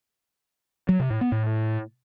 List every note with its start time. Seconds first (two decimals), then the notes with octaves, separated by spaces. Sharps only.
0.89 F#3
1.00 C3
1.10 A2
1.21 B3
1.32 A2